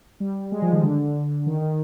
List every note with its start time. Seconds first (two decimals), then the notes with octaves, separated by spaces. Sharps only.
0.20 G3
0.52 G#3
0.62 F3
0.72 D#3
0.83 D3
1.46 D#3
1.61 D#3